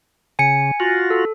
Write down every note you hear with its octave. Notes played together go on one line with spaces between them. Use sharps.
C#3 G#5 C#7
F4 F#4
A4